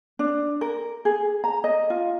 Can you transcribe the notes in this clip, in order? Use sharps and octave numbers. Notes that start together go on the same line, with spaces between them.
D4
A#4
G#4
A#5
D#5
F4